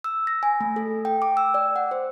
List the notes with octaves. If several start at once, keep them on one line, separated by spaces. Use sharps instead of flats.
E6
A#6
G#5
A3
A4
G5
D6
E6
D5
F#5
C5